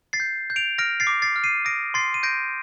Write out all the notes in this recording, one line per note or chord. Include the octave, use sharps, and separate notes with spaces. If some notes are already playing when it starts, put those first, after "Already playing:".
A6 C7
G6
G6
D7 F7
F6 A#6 D7
A6 C7
D6
A6 C7
F6
C7 D#7
D#6 A#6 D7
C6 A6 C7
D#7
G6 A#6 D7